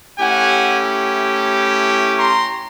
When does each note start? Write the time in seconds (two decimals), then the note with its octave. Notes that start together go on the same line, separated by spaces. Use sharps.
0.19 A3 C#4 E4 G4 F#5 G#5
2.18 A#5 C6